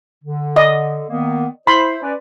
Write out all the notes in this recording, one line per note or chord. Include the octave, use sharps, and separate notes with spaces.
D3
D5 D#5
D#3 A#3 B3
E4 C5 B5 C6
C#4 B4 D5